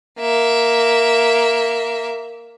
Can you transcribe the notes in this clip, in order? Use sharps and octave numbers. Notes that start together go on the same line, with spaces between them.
A#3 E5